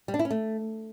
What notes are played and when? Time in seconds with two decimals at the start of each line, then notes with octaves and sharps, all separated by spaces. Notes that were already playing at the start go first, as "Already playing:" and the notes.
0.08 G3
0.14 D4
0.19 E4
0.25 C#4
0.30 A3